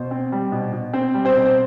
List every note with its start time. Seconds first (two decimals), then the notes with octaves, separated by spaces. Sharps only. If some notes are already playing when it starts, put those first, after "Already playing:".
Already playing: B2 C5
0.11 C4
0.32 G3
0.52 B2
0.73 B2
0.93 C4 C5
1.14 G3
1.25 C4 C5
1.35 B2
1.46 C5